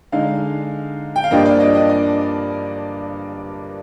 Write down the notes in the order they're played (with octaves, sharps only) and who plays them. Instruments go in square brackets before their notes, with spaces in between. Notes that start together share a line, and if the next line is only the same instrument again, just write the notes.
[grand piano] D3 G#3 D#4 F5
G5
F5
G2 F3 A#3 D4 D#5
D5
D#5
D#5
D5